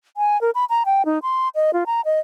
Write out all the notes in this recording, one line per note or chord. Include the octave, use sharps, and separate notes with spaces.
G#5
A#4
B5
A#5
G5
D#4
C6
D#5
F4
A#5
D#5